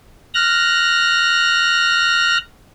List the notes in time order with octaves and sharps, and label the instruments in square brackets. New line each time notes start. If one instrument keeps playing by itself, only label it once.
[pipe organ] F6 F#6 A#6